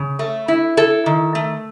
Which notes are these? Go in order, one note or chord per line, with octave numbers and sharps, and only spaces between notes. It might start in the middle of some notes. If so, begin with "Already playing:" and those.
Already playing: C#3
A3
E4
E4 A4
D#3
A3